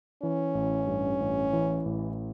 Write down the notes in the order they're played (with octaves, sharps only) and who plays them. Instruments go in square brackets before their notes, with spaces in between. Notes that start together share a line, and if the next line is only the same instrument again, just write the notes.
[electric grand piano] E3 [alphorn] C#4
[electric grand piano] A1
G2
A1
E3
A1